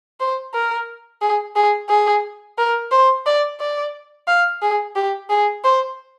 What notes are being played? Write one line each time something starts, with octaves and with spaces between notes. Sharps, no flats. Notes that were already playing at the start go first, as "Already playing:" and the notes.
C5
A#4
G#4
G#4
G#4
A#4
C5
D5
D5
F5
G#4
G4
G#4
C5